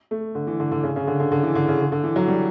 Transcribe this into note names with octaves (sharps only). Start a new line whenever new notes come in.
A3
D3
E3
D3
D3
C#3
C#3
D3
D3
D3
E3
D3
C#3
D3
D3
E3
F#3
G3